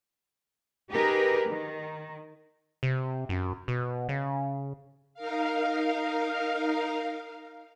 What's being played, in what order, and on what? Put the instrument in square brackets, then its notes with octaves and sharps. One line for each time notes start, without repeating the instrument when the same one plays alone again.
[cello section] D#4 G4 G#4 A#4 B4
D#3
[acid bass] C3
F#2
B2
C#3
[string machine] D#4 A#4 F5